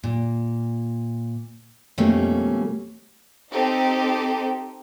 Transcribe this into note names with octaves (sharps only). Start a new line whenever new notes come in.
A#2
F2 B2 G3 A3 A#3 C#4
C4 D#4 G4 A4